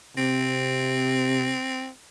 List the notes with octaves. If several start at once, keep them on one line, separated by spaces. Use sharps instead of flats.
C3 C4